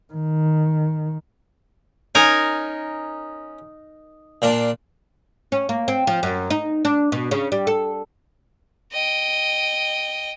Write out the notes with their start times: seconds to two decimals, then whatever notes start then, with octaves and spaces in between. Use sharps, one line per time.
0.14 D#3
2.15 C#4 D#4 A#4 G#5
4.42 A#2 D4 F5
5.52 C#4
5.69 A#3
5.88 C4
6.07 F3
6.23 F#2
6.50 D#4
6.85 D4
7.12 B2
7.31 C#3
7.52 G3
7.67 A4
8.92 D#5 G5